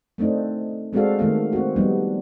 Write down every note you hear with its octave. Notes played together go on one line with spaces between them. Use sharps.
A3 C4 D4 D#4
G#3 C4 D4 F#4 A4 F5
D#3 A3 A#3 F5
C4 F#4
F3 G3 B3 D4 D#4